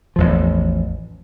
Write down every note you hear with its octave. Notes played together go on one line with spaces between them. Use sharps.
A1 E2 F3